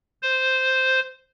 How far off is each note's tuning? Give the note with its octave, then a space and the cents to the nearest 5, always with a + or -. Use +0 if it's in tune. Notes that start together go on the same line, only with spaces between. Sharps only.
C5 -5